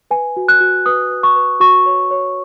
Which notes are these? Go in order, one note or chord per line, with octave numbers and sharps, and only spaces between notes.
B4 G#5
F#4
F#6
F#4
B4 D#6
B4
C#6
B4
F#4 C#6
C#5
C#5